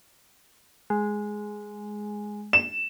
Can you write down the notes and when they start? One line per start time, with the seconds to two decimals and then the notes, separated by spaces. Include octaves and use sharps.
0.90 G#3
2.53 E7